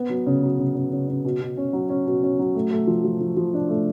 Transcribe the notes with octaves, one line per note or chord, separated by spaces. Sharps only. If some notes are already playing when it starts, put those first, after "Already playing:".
Already playing: B3
F#3
C#3
F#3
C#3
C#3
C#3
C#3
B2
B2
C#4
F#3
C#4
B2
C#4
F#3
A3
A3
F3
F3
F3
F3
D4
A3